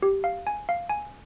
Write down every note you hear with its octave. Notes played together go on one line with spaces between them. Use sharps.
G4
F5
G#5
F5
G#5